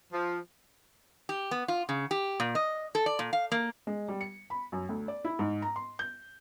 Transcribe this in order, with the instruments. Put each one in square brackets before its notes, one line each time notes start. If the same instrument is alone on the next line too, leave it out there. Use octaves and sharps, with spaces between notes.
[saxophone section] F3
[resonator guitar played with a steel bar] G4
B3
F4
C#3
G4
A#2
D#5
A4
D5
A#2
F5
A#3
[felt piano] G#3
G3
C#7
B5
F#2
D2
D5
E4
G#2
A#5
C6
G6